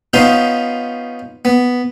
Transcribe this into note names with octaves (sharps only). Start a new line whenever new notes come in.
B3 C#4 D#4 F4 C5
B3